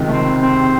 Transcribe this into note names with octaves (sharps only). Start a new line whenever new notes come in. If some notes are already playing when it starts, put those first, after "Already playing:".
Already playing: C#2 C3 D#3
A3
C4
C4